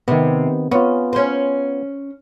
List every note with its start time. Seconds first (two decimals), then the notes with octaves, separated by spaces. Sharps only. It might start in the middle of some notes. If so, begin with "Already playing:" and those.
0.08 C3 D#3 B3
0.71 B3 C#4 F4
1.13 C#4 C5